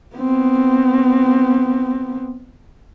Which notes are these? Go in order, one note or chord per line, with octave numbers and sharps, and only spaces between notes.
B3 C4